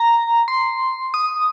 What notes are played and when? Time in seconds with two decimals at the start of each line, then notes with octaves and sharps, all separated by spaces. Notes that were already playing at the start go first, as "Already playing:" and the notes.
Already playing: A#5
0.48 C6
1.14 D#6